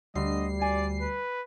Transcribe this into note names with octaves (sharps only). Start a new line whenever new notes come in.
D2 D3 G3 D#5 C7
D5 G#5
B4